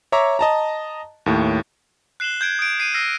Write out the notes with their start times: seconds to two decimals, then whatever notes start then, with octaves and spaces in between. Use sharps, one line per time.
0.12 C#5 E5 A#5 C#6 D6
0.39 D#5 A5 A#5
1.26 D#2 A2
2.20 F#6 C7 E7 F#7 G7
2.41 G6 G#6 D7
2.59 D#6 D7
2.80 C7 D#7
2.94 E6 F6 A#6 C7